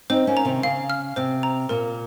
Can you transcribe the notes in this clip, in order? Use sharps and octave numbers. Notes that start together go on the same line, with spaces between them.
C4 D#4 C5
A#3 C#4
A#5
C3 D#3
C#3 F5
F6
C3 C5
A#5
A#2 A#4